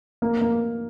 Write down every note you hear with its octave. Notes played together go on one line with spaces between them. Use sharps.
A#3
A#3